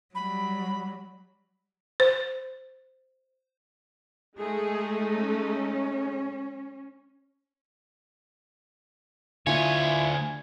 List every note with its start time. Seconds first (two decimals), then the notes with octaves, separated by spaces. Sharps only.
0.15 F#3 G3 B5
2.00 C5
4.38 G#3 A3 D#4 G#4
5.15 C#4
9.47 D2 D3 E4 F4 C#5 G#5